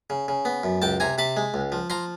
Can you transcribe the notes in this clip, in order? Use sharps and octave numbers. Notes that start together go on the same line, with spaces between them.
C#3
C#3
B3
F#2
C#2 G5 A5
C3 G#5 A#5
C3 A5 B5
G#3
C#2
F3
F3 A#5 C6